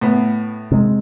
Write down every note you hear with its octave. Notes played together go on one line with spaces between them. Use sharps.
A2 B3
C3 G#3